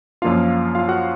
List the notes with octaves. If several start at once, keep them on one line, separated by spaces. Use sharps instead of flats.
F#2 F3 A#3 D4 F4 F5
F4 F5
F#4 F#5